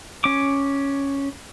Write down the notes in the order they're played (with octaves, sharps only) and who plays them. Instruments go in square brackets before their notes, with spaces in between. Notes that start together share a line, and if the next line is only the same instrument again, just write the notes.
[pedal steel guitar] C#4 D6